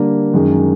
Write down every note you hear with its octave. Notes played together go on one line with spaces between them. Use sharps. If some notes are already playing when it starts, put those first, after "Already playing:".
Already playing: D3 G3 A#3
F#2 D#3 G#3